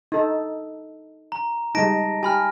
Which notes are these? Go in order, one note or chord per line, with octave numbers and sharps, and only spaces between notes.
D#4 A4
A#5
G3 G#3 D#4 A5 A#6 D7
G4 G#5 B5 F6